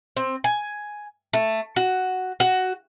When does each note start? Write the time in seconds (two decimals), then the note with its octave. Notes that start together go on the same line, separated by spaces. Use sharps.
0.17 C4
0.44 G#5
1.33 A3
1.76 F#4
2.40 F#4